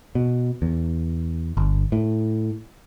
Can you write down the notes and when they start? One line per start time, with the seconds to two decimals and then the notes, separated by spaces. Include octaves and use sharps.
0.15 B2
0.62 E2
1.57 G1
1.92 A2